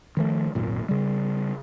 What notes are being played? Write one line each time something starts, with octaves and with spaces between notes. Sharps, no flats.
D#3 F3 A3
D1 G#1 F#2 A#2
C#3 G3